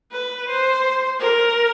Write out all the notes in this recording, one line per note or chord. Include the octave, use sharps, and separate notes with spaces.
B4
C5
A#4